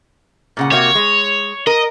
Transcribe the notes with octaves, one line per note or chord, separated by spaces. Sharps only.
A#2 C#3 F#5
C3 A#3 F#4 C#5
G#3
A#4 D#5